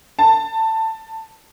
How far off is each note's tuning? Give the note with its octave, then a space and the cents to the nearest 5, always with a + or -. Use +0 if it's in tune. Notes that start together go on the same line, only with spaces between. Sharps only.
A5 +15